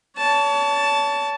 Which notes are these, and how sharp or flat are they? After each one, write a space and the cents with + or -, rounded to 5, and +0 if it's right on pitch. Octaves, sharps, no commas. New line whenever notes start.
C#5 +35 A5 +0